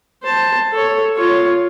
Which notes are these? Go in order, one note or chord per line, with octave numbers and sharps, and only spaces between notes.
C5 A5
A4 C#5
F4 C#5